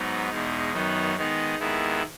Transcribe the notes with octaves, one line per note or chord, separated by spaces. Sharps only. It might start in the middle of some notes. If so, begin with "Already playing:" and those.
Already playing: G#2 F#3 B3 D#4
E2 B2 G#3 D#4
F#2 D#3 F#3 B3 D#4
D#3 G#3 B3 D#4
D#2 D#3 G#3 B3 E4